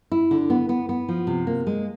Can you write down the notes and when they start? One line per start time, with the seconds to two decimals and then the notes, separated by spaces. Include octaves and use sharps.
0.12 E4
0.31 D3
0.50 B3
0.69 B3
0.89 B3
1.09 F3
1.27 C3
1.47 A#3
1.67 G#3